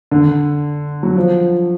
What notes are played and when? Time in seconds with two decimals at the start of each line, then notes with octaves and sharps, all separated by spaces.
0.11 D3
1.03 F#3
1.16 F3